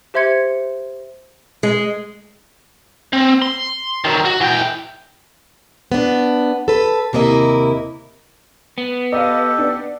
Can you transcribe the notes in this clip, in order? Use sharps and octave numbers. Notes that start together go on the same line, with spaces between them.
G4 C5 E5 C6 G#6 C#7
G#3
C4
C6
D#3 F#3
F#4
E3 G5
B3 D4
A4 B4
D#2 C3 A#3 E4 D#5
B3
G4 A4 D#5 F5
D4